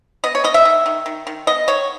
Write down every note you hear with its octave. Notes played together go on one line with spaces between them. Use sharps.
B3 D#5
C#5
B3 D#5
E5
D#3
D#3
D#3
D#3
B3 D#5
D#3 C#5